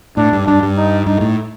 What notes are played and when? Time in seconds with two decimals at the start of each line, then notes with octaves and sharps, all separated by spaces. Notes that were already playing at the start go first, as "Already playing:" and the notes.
0.17 A2 D4
0.33 G2
0.47 G2 D4
0.62 G2
0.77 D#4
1.06 G2 D#4
1.21 A2